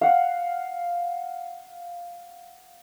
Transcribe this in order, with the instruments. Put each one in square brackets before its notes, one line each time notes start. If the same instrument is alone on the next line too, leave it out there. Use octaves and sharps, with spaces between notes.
[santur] F5 F#5